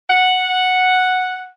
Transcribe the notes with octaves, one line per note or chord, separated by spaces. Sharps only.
F#5